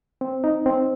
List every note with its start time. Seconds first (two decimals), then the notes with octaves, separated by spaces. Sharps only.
0.21 C4
0.44 D#4
0.66 C4